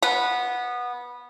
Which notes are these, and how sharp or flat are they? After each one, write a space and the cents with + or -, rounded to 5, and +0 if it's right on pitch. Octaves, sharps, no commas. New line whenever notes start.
B3 -15